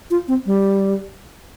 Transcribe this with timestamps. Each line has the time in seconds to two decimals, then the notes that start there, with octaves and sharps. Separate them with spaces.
0.11 F4
0.28 C4
0.46 G3